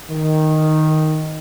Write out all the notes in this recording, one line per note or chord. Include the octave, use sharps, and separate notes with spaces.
D#3